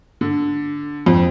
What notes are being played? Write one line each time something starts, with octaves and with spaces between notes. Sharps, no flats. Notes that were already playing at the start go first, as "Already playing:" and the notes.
D3
F2